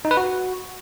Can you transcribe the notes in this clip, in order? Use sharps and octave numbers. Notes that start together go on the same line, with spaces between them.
D#4
B4
F#4